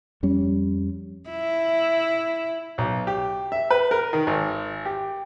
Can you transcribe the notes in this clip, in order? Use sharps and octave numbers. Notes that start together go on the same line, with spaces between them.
F2 G3 C#4
E4
B1
G4
E5
B4
A#4
D#3
G#1
G4